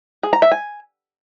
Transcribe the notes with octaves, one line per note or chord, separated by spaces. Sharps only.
G#4
A#5
E5
G#5